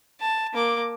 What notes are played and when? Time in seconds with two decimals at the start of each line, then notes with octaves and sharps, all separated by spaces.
0.21 A5
0.54 A#3 D6